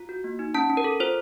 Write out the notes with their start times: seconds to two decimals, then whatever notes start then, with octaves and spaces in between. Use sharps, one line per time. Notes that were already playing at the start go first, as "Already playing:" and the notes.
Already playing: F4
0.09 F#4
0.24 A#3
0.39 D#4
0.54 C#4 A5
0.70 C#4
0.77 A#4
0.84 A4
1.00 F4 C5